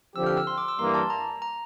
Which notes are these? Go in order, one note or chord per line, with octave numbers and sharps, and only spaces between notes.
D3 F3 C4 G4 E6
F6
E6
C6
D6
E6
G2 E3 G3 A#3 C6
A5
A#5
A#5